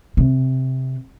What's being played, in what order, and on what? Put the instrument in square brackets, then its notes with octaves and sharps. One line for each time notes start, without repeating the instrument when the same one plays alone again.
[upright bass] C3